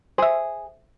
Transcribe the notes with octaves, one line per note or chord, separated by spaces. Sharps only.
G#4 C5 E5